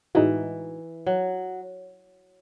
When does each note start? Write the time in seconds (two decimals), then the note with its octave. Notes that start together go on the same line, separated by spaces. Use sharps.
0.15 A2 E3 G#3 D#4 F#4
1.07 F#3